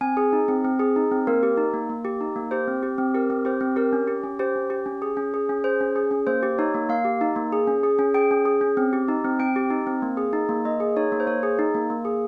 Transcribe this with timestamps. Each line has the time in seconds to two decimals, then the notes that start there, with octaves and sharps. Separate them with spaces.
0.01 C4 G#5
0.17 G#4
0.33 D#4
0.48 C4
0.64 C4
0.79 G#4
0.96 D#4
1.11 C4
1.27 A#3 A#4
1.43 G4
1.57 D#4
1.74 A#3
1.90 A#3
2.05 G4
2.21 D#4
2.36 A#3
2.51 G4 C5
2.68 C4
2.83 G4
2.98 C4
3.14 G4 A#4
3.30 C4
3.45 G4 C5
3.61 C4
3.76 G4 A#4
3.93 C#4
4.08 G4
4.24 C#4
4.39 G4 C5
4.56 C#4
4.70 G4
4.86 C#4
5.02 G#4
5.17 C#4
5.34 G#4
5.49 C#4
5.64 G#4 C5
5.81 C#4
5.96 G#4
6.11 C#4
6.27 A#3 C5
6.43 G4
6.58 D#4 C#5
6.74 A#3
6.89 A#3 F5
7.05 G4
7.21 D#4
7.36 A#3
7.53 G#4
7.67 C#4
7.83 G#4
7.99 C#4
8.14 G#4 G5
8.31 C#4
8.45 G#4
8.61 C#4
8.77 C4
8.93 G4
9.08 D#4
9.25 C4
9.40 C4 G5
9.56 G4
9.70 D#4
9.87 C4
10.02 A#3
10.17 G#4
10.33 D#4
10.49 A#3
10.65 A#3 D#5
10.80 G#4
10.97 D#4 C#5
11.12 A#3
11.20 C5
11.27 A#3 C#5
11.43 G#4
11.59 D#4
11.75 A#3
11.90 A#3
12.05 G#4